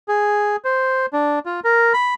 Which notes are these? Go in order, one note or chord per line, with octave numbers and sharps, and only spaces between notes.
G#4
C5
D4
F4
A#4
B5